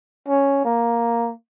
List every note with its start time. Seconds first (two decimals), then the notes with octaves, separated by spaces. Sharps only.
0.27 C#4
0.65 A#3